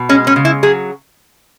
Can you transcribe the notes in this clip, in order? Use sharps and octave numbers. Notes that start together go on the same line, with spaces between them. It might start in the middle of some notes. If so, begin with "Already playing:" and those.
Already playing: B2
G#3 C#4
C#4
C#3
E4
F#3 G#4